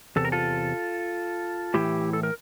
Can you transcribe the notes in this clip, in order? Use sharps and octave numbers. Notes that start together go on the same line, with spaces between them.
E2 C3 A4
A#4
F4 A4
A2 E3 E4 G4
A4
A#4